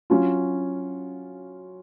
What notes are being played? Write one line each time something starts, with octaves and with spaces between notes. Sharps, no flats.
F#3 C#4 F4